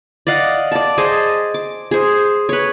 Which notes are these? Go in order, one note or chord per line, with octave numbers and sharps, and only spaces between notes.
D5 D#5 F5 F#5
D5 A5
G#4 C5 D#5 A5
D6
G#4 C5
B4 C#5